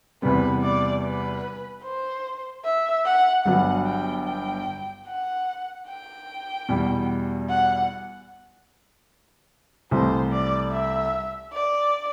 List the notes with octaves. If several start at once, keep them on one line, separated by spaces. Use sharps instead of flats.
E2 C3 G3 B3 B4
D5
B4
C5
E5
F#5
G1 G2 F#3 B3 F#5
G5
G5
F#5
G5
E2 B2 G3
F#5
C2 C3 E3 A3 C5
D5
E5
D5